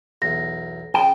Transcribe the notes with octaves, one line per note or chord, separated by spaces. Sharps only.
B1 E2 A#6
C#3 F3 G5